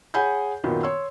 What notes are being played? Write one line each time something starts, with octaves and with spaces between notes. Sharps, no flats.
G#4 C#5 F#5 G#5 B5 G6
F#2 A#2 D#3 B3
C#5 C6 E6